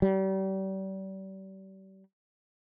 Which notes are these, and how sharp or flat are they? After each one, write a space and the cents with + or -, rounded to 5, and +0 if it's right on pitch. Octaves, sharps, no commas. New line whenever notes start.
G3 -35